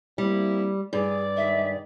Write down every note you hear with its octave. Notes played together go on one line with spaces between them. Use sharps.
G3 A#3 C4 E4
G2 G#4 D5
D#3 G#3 D#5 E5